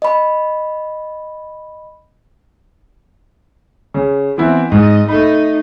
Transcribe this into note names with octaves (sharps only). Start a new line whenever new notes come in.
D#5 B5
C#3
E3 B3 C4 E4
G#2 D#5
A3 D#4 B5